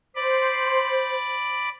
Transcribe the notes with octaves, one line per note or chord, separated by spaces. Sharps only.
C5 D5 B5